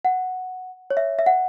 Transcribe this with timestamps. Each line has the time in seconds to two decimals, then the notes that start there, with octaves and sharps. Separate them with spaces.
0.05 F#5
0.90 C#5
0.97 E5
1.19 E5
1.26 F#5